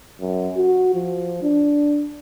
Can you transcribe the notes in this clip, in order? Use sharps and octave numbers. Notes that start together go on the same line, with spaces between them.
F#2
F#4
F3
D4